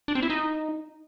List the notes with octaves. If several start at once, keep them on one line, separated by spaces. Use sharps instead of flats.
D4
C4
E4
D#4